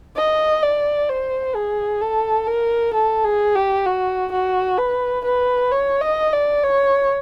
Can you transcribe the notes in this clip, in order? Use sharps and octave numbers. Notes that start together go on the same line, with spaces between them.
D#5
D5
C5
G#4
A4
A#4
A4
G#4
G4
F#4
F#4
B4
B4
C#5
D#5
D5
C#5